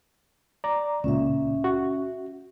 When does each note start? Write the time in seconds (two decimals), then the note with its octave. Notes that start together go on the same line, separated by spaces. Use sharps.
0.64 D5 A#5
1.04 C#2 A#2 C#4 E5
1.64 F#4